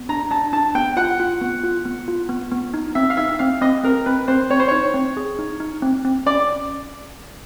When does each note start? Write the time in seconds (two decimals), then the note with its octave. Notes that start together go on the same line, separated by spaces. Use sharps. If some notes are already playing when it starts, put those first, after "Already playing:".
Already playing: B3
0.09 D4 A#5
0.31 D4 A5
0.53 D4 A5
0.75 B3 G5
0.97 F4 F#5
1.20 F4
1.41 B3
1.64 F4
1.85 B3
2.08 F4
2.29 B3
2.52 B3
2.74 D#4
2.95 C4 E5
3.10 F5
3.17 D#4 E5
3.39 C4 F5
3.61 C4 D#5
3.83 C4 A#4
4.06 C4 B4
4.28 C4 C5
4.50 C4 C#5
4.60 C5
4.68 D#4 C#5
4.94 C4
5.17 G#4
5.39 D#4
5.60 D#4
5.82 C4
6.05 C4
6.26 C#4 D5